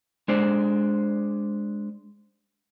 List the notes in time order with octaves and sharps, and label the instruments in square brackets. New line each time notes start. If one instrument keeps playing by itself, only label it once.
[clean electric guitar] G#3 D4 C5 D5